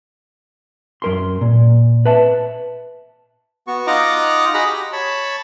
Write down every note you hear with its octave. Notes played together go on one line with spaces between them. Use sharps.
F#2 A#4 C6
A#2
B4 E5 A5
B3 F#4 C#6
D#4 F4 D#5 F#5 A#5 D6
F#4 G#4 D#5 F#5 A#5 B5
G4
C#5 A5 B5 C#6